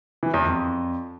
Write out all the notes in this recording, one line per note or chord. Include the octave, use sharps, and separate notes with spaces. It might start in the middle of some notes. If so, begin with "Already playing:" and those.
E3
E2
F2